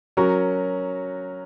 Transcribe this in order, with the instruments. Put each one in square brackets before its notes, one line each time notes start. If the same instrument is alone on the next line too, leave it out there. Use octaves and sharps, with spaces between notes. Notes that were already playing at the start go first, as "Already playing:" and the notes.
[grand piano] F#3 C#4 F#4 A#4